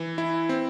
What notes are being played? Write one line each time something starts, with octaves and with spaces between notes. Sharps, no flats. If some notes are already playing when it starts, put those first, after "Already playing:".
Already playing: E3
E4
C4